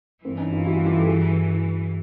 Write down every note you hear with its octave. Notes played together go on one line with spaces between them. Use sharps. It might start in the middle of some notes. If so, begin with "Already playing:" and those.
G1 G2 E3 A#3 C4
C#4 D#4
D#4 F4
E4 F#4
F4 G4
F4 G4
G4 A4
F#4 G#4